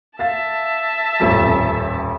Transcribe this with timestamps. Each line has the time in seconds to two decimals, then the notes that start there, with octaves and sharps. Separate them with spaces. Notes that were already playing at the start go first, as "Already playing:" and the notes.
0.19 E5 F5 A5 A6
1.20 D#1 A1 F2